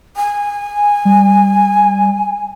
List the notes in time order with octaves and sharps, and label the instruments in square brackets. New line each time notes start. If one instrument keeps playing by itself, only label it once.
[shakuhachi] G#5
[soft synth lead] G3